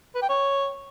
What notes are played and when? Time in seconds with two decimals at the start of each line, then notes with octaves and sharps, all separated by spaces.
0.15 B4
0.22 G5
0.29 C#5